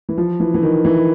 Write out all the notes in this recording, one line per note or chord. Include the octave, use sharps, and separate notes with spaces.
E3
F3
E3
E3
D#3
E3